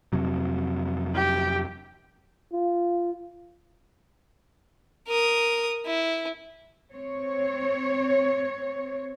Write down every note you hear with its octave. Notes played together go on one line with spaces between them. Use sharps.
F2 C3 F#3
G4
F4
A#4 D#6
E4
C4 C#5